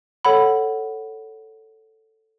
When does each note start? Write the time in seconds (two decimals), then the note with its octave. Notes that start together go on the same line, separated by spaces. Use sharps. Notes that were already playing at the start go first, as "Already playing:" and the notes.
0.25 A4 C#5 F#5 B5